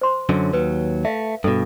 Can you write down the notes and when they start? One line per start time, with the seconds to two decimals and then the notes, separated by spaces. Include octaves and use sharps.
0.01 C5 C6
0.29 F#2 D3 F#3 C#5
0.53 D#2 F#3 B4
1.05 A3 E5 F5
1.44 G2 B2 A4